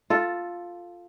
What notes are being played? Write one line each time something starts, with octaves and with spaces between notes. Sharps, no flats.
F4 A4